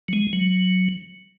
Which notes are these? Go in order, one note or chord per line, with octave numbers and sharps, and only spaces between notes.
F#3
G#3
F#3